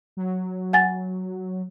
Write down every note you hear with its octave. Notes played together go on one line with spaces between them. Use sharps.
F#3
F#5 G#5 A6